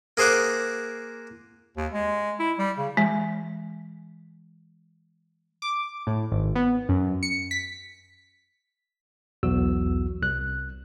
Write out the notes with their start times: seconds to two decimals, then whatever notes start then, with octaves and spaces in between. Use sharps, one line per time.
0.17 A#3 G#4 C5 F#5 D6
1.77 D#2
1.92 G#3
2.39 E4
2.59 G3
2.78 C#3
2.97 E3 G#3
5.62 D6
6.07 A2
6.32 G#1
6.56 B3
6.89 F#2
7.23 C#7
7.51 B6
9.43 B1 E2 F#4 E6
10.22 C2 F#6